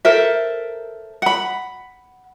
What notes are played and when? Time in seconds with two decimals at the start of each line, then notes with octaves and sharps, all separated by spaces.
0.05 A4 A#4 C5 E5
1.22 F#5 B5